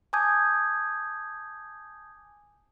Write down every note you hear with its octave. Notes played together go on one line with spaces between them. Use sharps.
G#5 A5 D6 D#6 G6 G#6